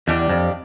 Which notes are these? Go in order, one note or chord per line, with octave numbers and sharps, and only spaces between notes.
E2 G3 D4 G4
F2